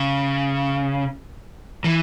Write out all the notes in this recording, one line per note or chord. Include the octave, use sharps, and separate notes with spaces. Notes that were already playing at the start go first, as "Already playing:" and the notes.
Already playing: C#3
E3